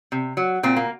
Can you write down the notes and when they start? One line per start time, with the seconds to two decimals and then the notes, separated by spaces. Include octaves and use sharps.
0.12 C3
0.37 F#3
0.63 A#2 C4
0.76 A#3